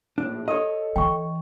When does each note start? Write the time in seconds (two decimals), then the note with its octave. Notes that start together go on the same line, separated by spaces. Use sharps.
0.18 A#1 A2 D4
0.48 G4 A4 C#5 D#5 D#6
0.96 E3 G5 C#6